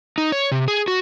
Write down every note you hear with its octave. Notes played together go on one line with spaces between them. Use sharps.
D#4
C#5
C3
G#4
F#4